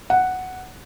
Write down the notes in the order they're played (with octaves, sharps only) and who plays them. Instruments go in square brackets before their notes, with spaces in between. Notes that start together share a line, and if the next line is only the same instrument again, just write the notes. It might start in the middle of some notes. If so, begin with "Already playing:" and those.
[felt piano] F#5